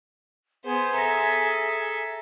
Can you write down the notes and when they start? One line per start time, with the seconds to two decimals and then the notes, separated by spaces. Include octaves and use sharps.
0.64 B3 G#4 C5
0.94 A4 E5 A#5 A#6